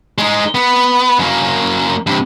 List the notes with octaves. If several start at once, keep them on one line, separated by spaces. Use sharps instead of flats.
G#3 D#4
B3
F#2 A#3
G2 C3